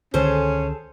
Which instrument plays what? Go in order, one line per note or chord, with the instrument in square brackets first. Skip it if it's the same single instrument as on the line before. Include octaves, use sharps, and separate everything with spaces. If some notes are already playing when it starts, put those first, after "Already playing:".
[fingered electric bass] C#2 D3 D#3 [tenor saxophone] C#4 [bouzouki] G#4 A4 [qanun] C5